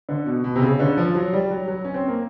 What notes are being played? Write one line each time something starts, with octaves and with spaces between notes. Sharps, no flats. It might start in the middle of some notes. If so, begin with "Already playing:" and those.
D3
B2
B2
C3
C#3
D3
F3
F#3
G3
F#3
F#3
C#4
C4
A#3